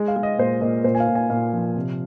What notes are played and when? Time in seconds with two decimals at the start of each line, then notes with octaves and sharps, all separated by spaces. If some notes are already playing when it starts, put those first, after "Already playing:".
Already playing: G#3 D#5
0.08 F5
0.16 G#3
0.23 D#5
0.38 A#2 C5
0.61 A#2 D#5
0.84 A#2 C5
0.95 G#5
1.00 F5
1.08 A#2
1.15 G#5
1.30 A#2 F5
1.53 F3
1.76 C3